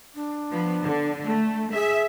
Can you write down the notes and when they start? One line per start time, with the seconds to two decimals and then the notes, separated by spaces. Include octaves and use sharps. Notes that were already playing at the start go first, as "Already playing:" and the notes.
0.15 D4
0.51 F3 B3
0.82 D3
1.26 A3 A5
1.74 G#4 E5